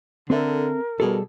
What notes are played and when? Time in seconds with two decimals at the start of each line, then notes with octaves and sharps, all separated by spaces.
0.30 D3 C4 A4 A#4 E5
1.00 B2 G3 G#4 A4